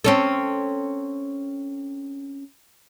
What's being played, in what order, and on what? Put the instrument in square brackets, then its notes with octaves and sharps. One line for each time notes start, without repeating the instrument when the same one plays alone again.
[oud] C4 C#4 A4